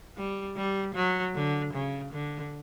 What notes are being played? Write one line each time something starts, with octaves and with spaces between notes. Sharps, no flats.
G3
G3
F#3
D3
C#3
D3